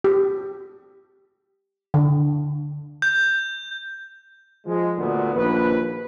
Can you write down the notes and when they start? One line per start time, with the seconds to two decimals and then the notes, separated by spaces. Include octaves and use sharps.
0.04 G4
1.94 D3
3.02 G6
4.66 F3 G#3
4.97 D2 A#2 D3 B3
5.34 A#1 D#2 B4